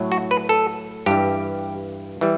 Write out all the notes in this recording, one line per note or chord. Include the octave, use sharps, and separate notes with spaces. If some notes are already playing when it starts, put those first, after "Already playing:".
Already playing: A2 F#3 A3
F#4
B4
A4
G2 E3 G3 G4
E3 G3